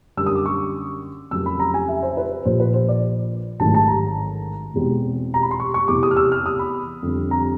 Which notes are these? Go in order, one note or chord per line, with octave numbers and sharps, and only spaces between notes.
F#2 D3 G3 A#3 E6
D#6
D6
C#6
F2 C#3 F#3 A#3 E6
B5
A#5
G#5
E5
C5
B4
A#1 A#2 F3 C5
B4
C5
D5
A1 G#2 D#3 F#3 A3 A5
A5
A#5
E1 E2 B2 G#3 C4
A#5
B5
C6
C#6
C#6
E2 C3 E3 D6
D#6
F6
E6
F6
D#6
B5
F2 D3 G3 C4
A#5